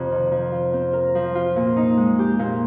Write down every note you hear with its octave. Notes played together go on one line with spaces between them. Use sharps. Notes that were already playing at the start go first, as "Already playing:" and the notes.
Already playing: F2 C3
D#3
F3
F4
C4
A#4
F3
F4
A#2
D#4
G#3
G4
A#2